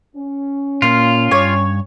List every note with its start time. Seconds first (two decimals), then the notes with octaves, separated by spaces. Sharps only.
0.16 C#4
0.82 A#2 A#3 F4
1.31 G2 C#5